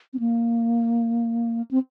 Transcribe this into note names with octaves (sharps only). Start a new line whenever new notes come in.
C4
A#3
C4